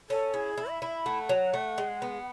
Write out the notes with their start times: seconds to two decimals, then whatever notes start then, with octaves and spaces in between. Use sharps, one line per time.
0.10 C#4 A4
0.34 E4 G#4
0.58 E4
0.70 E5
0.82 E4
1.06 A3 F#5
1.29 F#3
1.54 A3
1.78 G#3
2.02 B3